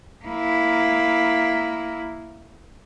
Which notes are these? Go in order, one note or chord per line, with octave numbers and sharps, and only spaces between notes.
A#3 E4